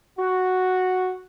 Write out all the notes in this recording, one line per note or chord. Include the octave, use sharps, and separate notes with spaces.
F#4